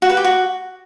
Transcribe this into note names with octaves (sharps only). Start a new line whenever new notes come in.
F#4
B4
G4
F#4